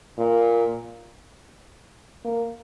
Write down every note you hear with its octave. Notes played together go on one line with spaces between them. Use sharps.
A#2
A#3